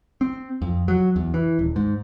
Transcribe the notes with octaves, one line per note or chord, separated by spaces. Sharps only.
C4
F2
F#3
E2
E3
D#1
G#2